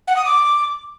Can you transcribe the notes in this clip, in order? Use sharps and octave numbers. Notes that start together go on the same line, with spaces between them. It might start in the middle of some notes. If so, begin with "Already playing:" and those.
F#5
D#6
D6